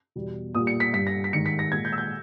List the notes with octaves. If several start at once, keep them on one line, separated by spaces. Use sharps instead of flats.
E2 B2 G3
A#2 G3 D#6
C#7
B6
G2 G3 B6
A#6
B6
G#2 D#3 G3 C#7
B6
A#6
A#2 G#3 G#6
G6
E6
G6